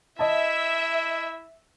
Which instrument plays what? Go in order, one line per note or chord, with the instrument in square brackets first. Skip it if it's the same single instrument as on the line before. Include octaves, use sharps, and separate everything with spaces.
[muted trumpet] E4 [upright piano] D#5 A5 [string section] E5